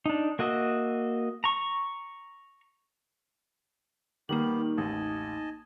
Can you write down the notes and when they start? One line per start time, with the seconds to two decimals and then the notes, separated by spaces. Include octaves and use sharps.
0.06 D4 D#4
0.39 A#3 F#4 D#5 E5
1.44 A#5 C#6
4.29 D#3 G3 A#3 B3 G4 F#7
4.58 D#4
4.77 A1 D#2 D#5 G#5 A5